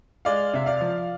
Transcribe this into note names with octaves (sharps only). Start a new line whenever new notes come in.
G#3 D5 F5
C3 E5
D5 F5
F3